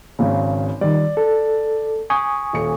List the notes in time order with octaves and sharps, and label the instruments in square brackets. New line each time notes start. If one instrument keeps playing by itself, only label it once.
[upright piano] G#1 C#3
[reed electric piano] D#3 G3 [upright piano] D5
[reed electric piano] A4
G#5 C#6 D#6
[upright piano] D#1 C#7